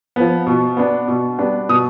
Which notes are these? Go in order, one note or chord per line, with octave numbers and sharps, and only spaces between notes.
F3 B3
B2
B3 D4
B2
G3 B3 D4
B2 D#6